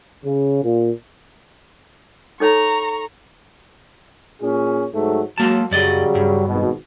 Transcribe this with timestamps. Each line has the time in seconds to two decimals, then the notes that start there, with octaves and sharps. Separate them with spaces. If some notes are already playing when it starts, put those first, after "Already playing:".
0.25 C#3
0.64 A#2
2.40 D#4 A4 C#5 A#5 C#6
4.41 A#2 C#4 G#4
4.94 G#2 F#3 A3
5.38 F#3 G#3 A#3 A5
5.71 F#2 C#3 F#3 G3 D5 D#5
6.15 G2
6.47 G#1 B2